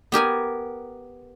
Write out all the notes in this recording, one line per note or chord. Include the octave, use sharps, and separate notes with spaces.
B3 G4 A#4 G#5